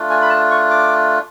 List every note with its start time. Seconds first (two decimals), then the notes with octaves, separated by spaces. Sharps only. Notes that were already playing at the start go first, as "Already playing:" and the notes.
Already playing: A3 D4 F4
0.10 G#5
0.22 B5
0.30 A5
0.51 C#6
0.70 D6